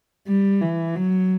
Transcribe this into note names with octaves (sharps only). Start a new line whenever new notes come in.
G3
E3
F#3